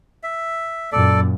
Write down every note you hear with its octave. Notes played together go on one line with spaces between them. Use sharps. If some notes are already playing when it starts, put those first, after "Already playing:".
E5
F#2 A#2 A4 D5